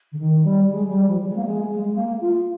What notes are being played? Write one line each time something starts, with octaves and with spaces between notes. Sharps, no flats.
D3
D#3
G3
G#3
G3
F3
G#3
A#3
G#3
G#3
G#3
A#3
F4